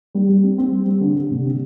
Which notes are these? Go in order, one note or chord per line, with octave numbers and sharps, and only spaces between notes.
G3
G3
C4
C4
G3
G3
D3
D3
C3
C4